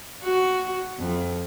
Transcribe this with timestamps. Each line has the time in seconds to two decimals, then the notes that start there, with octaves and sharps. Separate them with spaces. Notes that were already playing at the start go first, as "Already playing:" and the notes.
0.22 F#4
0.99 F2